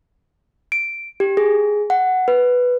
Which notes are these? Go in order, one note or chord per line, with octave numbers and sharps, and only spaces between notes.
D7
G4
G#4
F#5
B4